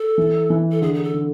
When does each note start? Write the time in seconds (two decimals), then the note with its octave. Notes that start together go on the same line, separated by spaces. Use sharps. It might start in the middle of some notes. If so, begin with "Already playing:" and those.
Already playing: A4
0.18 E3
0.50 E3
0.71 A4
0.82 D3 G#4
0.94 G#4
1.04 A4
1.14 D3